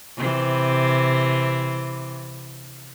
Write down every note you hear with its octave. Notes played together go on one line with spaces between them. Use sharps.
C3 E3